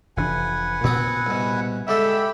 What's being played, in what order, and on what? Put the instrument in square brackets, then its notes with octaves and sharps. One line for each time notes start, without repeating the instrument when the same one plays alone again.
[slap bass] F1 E3 D4 [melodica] B4 F#5 G#5
[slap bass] A#2 [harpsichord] B3 C4 D#6
[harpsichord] C2 B2
[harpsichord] D3 G#3 A4 [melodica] G4 G5 B5 [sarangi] E5